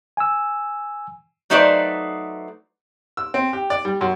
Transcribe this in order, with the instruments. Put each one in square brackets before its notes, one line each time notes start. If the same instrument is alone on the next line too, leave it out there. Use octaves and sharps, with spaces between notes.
[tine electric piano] G#5 E6
[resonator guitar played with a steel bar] F#3 A3 D#4 B4 C5 D5
[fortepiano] E6
C4
G4
D5
G3
F#2